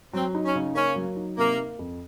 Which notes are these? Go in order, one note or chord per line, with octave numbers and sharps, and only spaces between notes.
F#3 C4
D#4
C#4
C#3
A#3 C#4
F#3
D#4
C3 A#3
A#3
F2